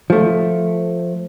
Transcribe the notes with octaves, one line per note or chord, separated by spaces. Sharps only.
F3 A3